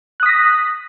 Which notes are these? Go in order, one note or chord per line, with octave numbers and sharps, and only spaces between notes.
D#6 F#6 A#6 B6